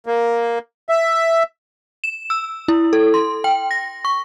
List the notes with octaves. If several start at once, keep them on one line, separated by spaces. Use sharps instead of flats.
A#3
E5
E7
E6
E4
A4
C6
G5
A#6
C#6